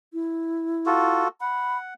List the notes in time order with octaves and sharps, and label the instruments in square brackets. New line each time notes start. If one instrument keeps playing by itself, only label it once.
[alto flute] E4
[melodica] F4 F#4 A4
[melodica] F#5 [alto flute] B5